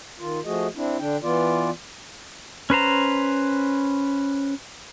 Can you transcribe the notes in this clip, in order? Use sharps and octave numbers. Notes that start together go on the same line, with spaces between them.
D#3 F4
F3 A3 F#4 G#4 D#5
C4 D4 E4
D3 D4 G5
E3 B3 F4 D5
C#4 B4 C5 A#5